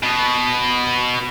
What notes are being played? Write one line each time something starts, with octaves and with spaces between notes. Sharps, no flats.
B2